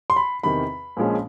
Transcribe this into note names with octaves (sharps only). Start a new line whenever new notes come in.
C6
B5
E2 C3 D#3 B5
A#1 A#2 F3 G#3 C#4